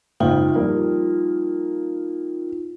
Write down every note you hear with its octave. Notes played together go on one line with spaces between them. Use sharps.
F#1 G#2 D#4 F4 G5
F3 G3 A#3